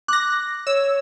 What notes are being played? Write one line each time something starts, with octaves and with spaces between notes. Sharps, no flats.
D6 F#6 A#6
C#5 E6